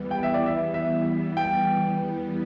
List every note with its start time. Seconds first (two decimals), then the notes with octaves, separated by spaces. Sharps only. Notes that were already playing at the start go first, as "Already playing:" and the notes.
Already playing: E2 E3 G3 B3
0.11 G5
0.23 E5
0.34 D5
0.46 E5
0.74 E5
1.37 G5